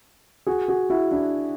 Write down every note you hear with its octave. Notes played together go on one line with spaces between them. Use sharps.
F#4 G#4
F#4 G#4
E4 F#4
D4 E4